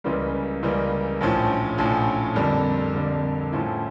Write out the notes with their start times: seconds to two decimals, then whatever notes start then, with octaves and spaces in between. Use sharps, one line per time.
0.04 C#2 C#3 E3 G3 A#3
0.62 C#2 C#3 E3 G3 A#3
1.21 A#1 A2 F3 C#4
1.78 A#1 A2 F3 C#4
2.35 F2 D3 G3 A#3
2.94 F2 D3 G3 A#3
3.52 A2 F3 C#4 E4